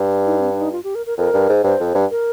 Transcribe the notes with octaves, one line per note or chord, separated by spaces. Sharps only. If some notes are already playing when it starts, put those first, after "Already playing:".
Already playing: G2
D#4
C4
D4
D#4
F4
G4
A#4
A#4
F2 A#4
G2
G#2
G2 C5
F2
G2
A#4